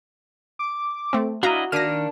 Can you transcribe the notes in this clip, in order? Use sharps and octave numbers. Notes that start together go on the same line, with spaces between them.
D6
A3 C4
D4 E4 F#4 D#5 F5 A#5
D#3 A#3 D4 F6 A#6 D#7